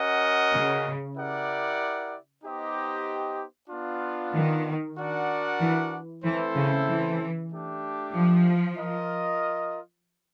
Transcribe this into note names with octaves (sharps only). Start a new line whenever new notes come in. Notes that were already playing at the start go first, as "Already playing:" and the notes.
Already playing: C#4 F#4 A#4 D#5 F#5
C#3
E4 G4 A#4 D5 F#5
B3 D#4 G4 C5 D#5
B3 D4 F4
D#3
D4 F#4 A#4 D5 F#5
E3
E3 A3 C4 E4 A4 C5
C#3
E3
A3 D4 G4
F3
F4 A#4 D#5